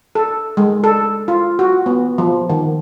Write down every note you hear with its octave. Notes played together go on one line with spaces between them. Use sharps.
A4
G#3
A4
F4
F#4
B3
F3
D#3